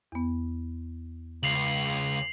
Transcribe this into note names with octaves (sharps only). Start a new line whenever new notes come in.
E2 B3
C#2 C7 F7 F#7